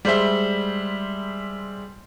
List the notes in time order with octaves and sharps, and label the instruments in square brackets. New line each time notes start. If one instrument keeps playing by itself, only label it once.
[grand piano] G3 G#3 C5 E5